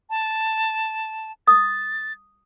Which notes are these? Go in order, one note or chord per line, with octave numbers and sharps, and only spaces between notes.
A5
D#6 A6